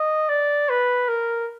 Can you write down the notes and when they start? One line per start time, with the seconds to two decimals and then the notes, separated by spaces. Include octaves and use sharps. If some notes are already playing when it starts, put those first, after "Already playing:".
Already playing: D#5
0.29 D5
0.69 B4
1.08 A#4